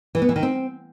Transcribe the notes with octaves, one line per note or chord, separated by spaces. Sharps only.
E3
B3
E3
D#3
C4